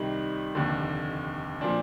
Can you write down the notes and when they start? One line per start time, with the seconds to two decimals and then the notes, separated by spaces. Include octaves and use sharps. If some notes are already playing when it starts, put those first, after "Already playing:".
Already playing: C2 C3 D#3 G3 D#4
0.55 F1 D#2 D3
1.61 A#2 F3 D4